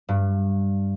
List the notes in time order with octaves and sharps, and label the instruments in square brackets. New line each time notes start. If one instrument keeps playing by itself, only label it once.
[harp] G2